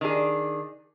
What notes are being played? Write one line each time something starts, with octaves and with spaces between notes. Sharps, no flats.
D#3 D4 G#4